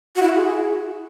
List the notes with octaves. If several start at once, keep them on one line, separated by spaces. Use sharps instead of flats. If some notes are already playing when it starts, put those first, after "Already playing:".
F#4
E4
F#4
G#4